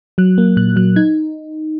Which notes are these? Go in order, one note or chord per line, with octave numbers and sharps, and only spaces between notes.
F#3 F#6
A#3
A#2 F#6
F#3 F#6
D#4 G#6